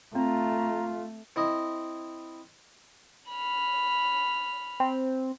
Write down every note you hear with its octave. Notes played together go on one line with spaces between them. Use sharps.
A3 C4 F4 A#5
C4 E4 D#5
B5 F6
C4